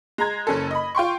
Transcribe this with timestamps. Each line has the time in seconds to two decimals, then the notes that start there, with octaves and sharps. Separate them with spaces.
0.18 G#3 A#5 G#6
0.47 F#1 C#4 A4
0.71 D#5 B5
0.95 F4 G5 C6 C#6